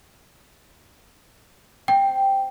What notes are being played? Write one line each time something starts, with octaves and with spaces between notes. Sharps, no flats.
C4 G5